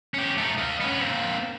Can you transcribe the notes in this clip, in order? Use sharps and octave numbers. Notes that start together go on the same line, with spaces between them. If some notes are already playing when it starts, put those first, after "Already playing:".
C#4 G4
A3 D#4
D#5 F5
B3 C#4
A#3 C4